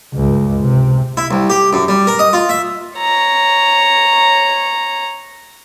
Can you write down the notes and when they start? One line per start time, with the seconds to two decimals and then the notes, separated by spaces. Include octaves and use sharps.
0.14 C#2 G2
0.60 C3
1.17 E4
1.31 C2
1.50 G4
1.73 F#2
1.88 G3
2.07 A#4
2.19 D#5
2.33 F4
2.49 E5
2.98 C#5 A#5